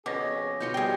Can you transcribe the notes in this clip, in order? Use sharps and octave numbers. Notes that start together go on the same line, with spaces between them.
F2 B2 C#4 G#4 D6 A#6
B2 F4 C6 G6 A#6 C#7
E2 G3 G#4 G5